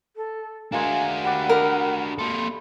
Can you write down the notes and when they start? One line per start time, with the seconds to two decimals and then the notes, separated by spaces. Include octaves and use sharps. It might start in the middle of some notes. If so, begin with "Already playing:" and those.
0.16 A4
0.72 G#3 A#3 D4 F#4 G#5
1.24 G3 D5 F#5
1.49 A#4 D#5 B5
2.19 A#3 A4 C6